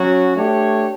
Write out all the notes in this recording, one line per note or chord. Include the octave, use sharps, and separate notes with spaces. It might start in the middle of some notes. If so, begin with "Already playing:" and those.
Already playing: F#3 C#4 F#4
A3 D4 G4 C#5